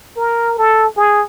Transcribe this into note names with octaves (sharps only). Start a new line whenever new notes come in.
A#4
A4
G#4